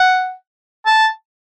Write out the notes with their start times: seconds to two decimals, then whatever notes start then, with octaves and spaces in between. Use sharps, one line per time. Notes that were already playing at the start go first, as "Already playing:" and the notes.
Already playing: F#5
0.86 A5